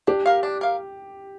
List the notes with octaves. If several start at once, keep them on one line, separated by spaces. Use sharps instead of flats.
D4 G4
A#4 F5
D4
A#4 F5